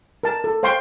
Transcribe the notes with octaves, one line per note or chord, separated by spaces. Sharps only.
A#4 A5
A4
C5 F5 G5 C6 C#6